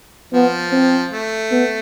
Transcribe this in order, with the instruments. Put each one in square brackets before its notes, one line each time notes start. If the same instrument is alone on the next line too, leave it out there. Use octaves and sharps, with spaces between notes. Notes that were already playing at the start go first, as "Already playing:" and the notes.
[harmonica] F3 [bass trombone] B3
[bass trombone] C4
[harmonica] A3
[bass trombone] B3